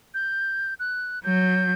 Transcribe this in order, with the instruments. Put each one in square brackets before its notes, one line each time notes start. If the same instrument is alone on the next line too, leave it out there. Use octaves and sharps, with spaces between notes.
[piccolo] G6
F#6
[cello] F#3 [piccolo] G6